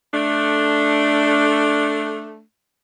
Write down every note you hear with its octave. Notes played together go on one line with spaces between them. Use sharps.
A3 D4